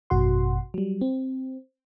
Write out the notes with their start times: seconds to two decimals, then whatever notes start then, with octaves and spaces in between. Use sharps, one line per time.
0.10 G#1 F#2 B2 F#4 F#5 C6
0.74 F#3 G3
1.01 C4